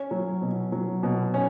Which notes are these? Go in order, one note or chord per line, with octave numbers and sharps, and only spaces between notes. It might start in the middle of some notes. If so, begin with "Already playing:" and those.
Already playing: C#4
F#3
B2
F#3
B2
C#4